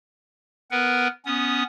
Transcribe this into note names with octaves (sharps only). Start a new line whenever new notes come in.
B3 A#4 B4 F#5
B3 C#4 D#6